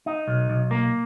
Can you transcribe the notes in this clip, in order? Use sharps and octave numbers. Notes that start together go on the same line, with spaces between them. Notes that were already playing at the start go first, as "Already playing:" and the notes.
D#4
B1
B1
A#3